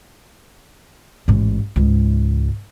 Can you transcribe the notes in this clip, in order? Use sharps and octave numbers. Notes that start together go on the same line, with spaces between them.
A1 G#2
C#2 G#2